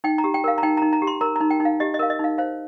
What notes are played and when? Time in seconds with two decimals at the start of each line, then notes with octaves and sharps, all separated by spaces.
0.04 D#4 G5
0.18 A#5
0.24 G4
0.34 G5
0.44 A#4 F5
0.58 A#5
0.63 D#4 G5
0.77 D#4 A#5
0.93 A#5
1.02 G4
1.07 C6
1.21 A#4 A#5
1.36 D#4 A#5
1.50 G5
1.60 D#4
1.65 F5
1.80 G4 D#5
1.94 D#5
1.99 A#4 F5
2.10 D#5
2.19 D#4 F5
2.38 C5 F5